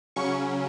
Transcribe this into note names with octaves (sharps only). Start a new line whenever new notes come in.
C#3 F#3 C#4 C#6